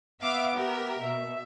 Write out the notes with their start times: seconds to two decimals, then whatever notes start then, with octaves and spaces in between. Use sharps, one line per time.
0.22 B3 E5 F5 D6
0.56 G4 A#4 E5
1.02 B2 E5